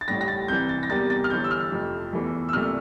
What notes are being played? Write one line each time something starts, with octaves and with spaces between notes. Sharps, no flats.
A6
A1 A2 G3 A#6
A#6
A6
C2 C3 E3 G6
A6
A#6
E2 C3 G3 A#3 A6
A6
F6
G1 G2 E3 G6
E6
F6
F2 C3 F3 A3
E2 E3 A3
E6
C2 A#2 A3 F6